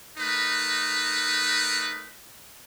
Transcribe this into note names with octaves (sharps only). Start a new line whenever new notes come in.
A3 D#4 A#4 B4